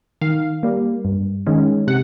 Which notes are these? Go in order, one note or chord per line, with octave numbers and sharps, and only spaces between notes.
D#3 F5
G3 A#3
G2
D#3 G#3 C#4
C3 F#5